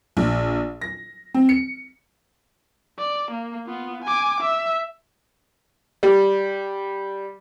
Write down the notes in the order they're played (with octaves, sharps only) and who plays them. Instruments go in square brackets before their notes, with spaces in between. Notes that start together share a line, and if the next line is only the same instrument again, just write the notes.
[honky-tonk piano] A#1
A#6
C4
C#7
[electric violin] D5
A#3
B3 F4
G#5 D6
E5
[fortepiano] G3